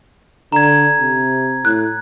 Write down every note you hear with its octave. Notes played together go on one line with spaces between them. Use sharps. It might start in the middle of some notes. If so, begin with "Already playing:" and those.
D3 A#5 G#6
C3
A2 F#6